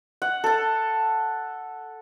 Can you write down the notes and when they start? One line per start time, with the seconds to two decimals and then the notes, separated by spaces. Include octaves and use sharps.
0.22 F#5
0.44 A4 A5